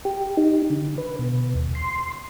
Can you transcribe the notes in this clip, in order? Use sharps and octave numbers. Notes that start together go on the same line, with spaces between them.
G4
D#4
D3
B4
B2
D#2
C6